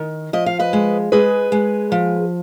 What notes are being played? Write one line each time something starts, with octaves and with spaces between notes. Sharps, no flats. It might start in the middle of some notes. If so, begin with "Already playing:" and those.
Already playing: D#3
F3 D#5
F5
B4 D#5
G#3
G#3 G#4 B4
G#3
F3